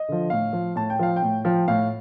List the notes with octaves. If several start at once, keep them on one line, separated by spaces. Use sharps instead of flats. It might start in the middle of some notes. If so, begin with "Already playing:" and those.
Already playing: D#5
D3 F3
A2 F5
F3
A2 A5
G5
F3 F5
G5
A2
F3
A2 F5